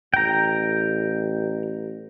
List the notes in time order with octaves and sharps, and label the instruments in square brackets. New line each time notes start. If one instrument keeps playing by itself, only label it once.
[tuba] A1 [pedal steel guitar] G5 A#5